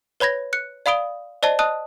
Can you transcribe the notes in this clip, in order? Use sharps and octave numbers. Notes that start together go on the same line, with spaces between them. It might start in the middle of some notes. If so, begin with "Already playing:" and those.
B4 C#5 B5 G#6 A#6
F#6 C#7
D5 F5 B5 D#6 D7 G7
C5 D5 D#5 A5 G7
D#5 A5 D#6 F#6